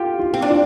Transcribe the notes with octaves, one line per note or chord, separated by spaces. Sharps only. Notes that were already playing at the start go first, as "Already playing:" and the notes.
Already playing: F4 G4
F4
C4
D4
F4